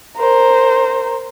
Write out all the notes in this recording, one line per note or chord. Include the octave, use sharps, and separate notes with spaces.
A#4 C5